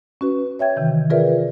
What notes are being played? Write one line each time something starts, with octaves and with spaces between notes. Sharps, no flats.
C#4 F#4 B4
C#5 E5 G5 G#6
C3 D#3 E3
F4 G#4 A#4 B4 D5 E5